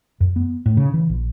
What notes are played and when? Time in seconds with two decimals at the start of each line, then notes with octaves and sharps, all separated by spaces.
0.20 F#2
0.36 B3
0.66 A2
0.77 C#3
0.94 E3
1.10 A#1